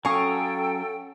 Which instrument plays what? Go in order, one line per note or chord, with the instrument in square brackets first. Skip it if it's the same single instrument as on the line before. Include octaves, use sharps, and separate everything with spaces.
[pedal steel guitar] F#3 C#4 D#6 [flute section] A4 G5 [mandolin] F5 G#5 C#6